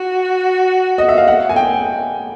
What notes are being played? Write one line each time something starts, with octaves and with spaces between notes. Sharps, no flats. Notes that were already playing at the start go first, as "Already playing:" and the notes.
Already playing: F#4
D#5
E5
F5
F#5
G#5
G5